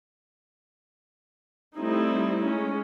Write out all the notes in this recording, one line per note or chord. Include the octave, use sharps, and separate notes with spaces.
G3 A3 C4 D#4 E4
G#3 C#4